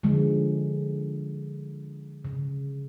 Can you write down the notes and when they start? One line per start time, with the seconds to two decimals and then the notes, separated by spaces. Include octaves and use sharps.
0.03 D3 F3 G#3
2.25 C#3